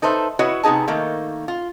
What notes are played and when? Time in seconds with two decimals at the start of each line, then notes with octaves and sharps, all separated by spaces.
0.02 D#4 A4 B4 C5 E5
0.39 E4 F#4 B4 C#5 D#5
0.63 C3 B3 D#4 G#4 A5
0.88 D#3 A3 A#3 D#4
1.48 F4